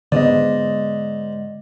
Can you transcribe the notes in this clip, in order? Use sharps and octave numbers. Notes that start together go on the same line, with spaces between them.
G#2 D3 G#3 B3 D5 D#5